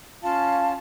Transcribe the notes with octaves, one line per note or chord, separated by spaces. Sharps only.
C#4 F4 F5 A5